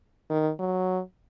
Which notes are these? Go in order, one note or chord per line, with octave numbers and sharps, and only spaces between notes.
D#3
F#3